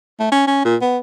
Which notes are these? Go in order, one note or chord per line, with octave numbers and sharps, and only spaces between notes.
A3
C#4
C#4
A#2
B3